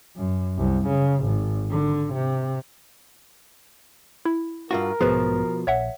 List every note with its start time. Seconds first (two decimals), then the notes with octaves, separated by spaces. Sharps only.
0.16 F#2
0.58 C2
0.87 C#3
1.25 G#1
1.71 D3
2.14 C3
4.25 E4
4.71 G2 F4 F#4 A#4
5.01 B1 G#2 B2 F3 B3 G#4 B4
5.67 A#1 C#5 E5 F#5